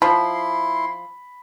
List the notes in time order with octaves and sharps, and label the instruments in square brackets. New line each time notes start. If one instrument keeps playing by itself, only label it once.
[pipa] F3 [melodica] E4 C6 [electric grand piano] B5